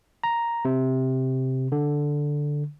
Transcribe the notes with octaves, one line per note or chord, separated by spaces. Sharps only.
A#5
C3
D3